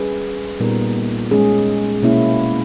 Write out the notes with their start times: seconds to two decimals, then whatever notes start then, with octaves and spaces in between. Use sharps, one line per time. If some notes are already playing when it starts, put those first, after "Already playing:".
Already playing: G3 C#4 G#4 B4
0.60 A#2 G3 B3 D#4 A#4
1.31 G#3 C#4 G#4
2.02 B2 A#3 C#4 E4